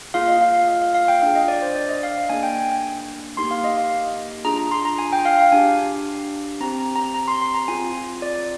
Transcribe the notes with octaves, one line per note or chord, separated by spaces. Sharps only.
A#3 F4 G#4 F5
D#5
F5
F5
F5
F5
F5
G5
D4 G#4 F5
D#5
D5
C5
D5
D#5
F5
A#3 D4 G#4 G#5
G5
G#5
A#3 D#4 G4 C6
F5
D#5
F5
D4 F4 G#4 A#5
A#5
C6
A#5
G#5
G5
F5
F5
D4 G4 G#5
C4 G4 A#5
A#5
A#5
A#5
C6
C6
A#5
C4 F4 G#4 G#5
D5